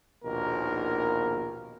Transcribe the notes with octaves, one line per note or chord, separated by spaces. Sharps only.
A#1 D#2 B2 D#3 A#3 A#4